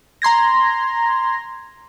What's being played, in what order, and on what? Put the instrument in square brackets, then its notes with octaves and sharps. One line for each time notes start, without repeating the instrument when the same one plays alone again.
[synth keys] A#5 C6 G#6 A#6